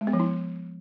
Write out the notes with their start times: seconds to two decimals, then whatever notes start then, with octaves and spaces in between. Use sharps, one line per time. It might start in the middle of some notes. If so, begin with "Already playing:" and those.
0.01 G#3
0.07 B3
0.13 F3
0.19 E4